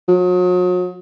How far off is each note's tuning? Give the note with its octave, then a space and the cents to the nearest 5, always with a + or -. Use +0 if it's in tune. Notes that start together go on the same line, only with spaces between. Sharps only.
F#3 -40